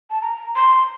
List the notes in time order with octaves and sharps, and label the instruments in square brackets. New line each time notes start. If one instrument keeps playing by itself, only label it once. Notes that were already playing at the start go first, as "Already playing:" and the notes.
[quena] A5
A#5
C6